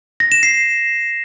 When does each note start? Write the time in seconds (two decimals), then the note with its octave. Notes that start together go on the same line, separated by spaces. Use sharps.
0.20 A#6
0.32 E7
0.43 C7